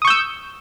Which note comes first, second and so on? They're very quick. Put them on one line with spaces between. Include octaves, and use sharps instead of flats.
D#6 C#6 G6 E6